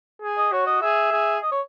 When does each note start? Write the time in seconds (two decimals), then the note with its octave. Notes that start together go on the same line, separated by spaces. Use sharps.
0.22 G#4
0.38 D#5
0.52 F#4 C#5
0.67 D#5
0.82 G#4 E5
1.12 G#4
1.43 D#5
1.52 C#5